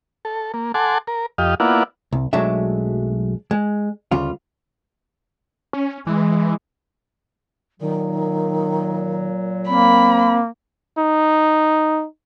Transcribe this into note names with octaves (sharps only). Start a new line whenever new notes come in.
A4
A#3
A4 F#5 G#5 A5 C6 D6
A#4
F2 G4 D#5 F5
A#3 B3 E4 F4 D5 F#5
C2
B1 F#3 G#3 A3 D4 E5
G#3
D2 C#3 G3 F4
C#4
E3 G#3
A#2 D#3 F#3
A#3 C4 B5
D#4